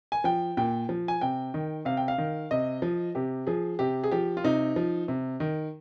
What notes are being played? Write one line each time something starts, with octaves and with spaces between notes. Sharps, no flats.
G#5
F3 G5
A#2 G5
F3
G#5
C3 G5
D#3
C3 F5
G5
F5
D#3
C3 D#5
F3
C3 G4
F3 G#4
C3 G4
G#4
F3 G4
F4
C3 D#4
F3
C3
D#3